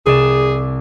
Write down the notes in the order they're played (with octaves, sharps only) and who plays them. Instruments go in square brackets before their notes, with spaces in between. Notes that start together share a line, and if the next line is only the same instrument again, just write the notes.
[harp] C2 D5 E7 [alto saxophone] G#4